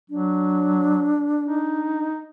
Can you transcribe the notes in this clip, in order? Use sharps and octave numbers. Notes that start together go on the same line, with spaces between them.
F#3 D4
D#4